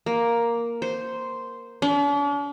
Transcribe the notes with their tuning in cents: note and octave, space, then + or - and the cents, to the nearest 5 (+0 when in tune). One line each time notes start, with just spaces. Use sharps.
A#3 +5
C5 -5
D4 -45